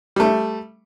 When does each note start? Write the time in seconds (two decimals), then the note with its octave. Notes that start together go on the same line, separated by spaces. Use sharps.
0.16 G3 A3